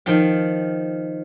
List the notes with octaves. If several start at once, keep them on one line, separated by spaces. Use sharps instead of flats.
D#3 F3 G5